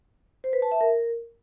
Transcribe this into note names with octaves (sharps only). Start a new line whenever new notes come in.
C5
B4
A5
E5
A#4